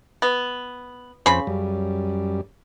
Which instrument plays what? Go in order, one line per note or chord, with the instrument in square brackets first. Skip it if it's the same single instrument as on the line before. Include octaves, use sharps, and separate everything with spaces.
[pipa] B3
[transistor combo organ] F2 C5 [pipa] C#3 B5
[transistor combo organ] F#2 G3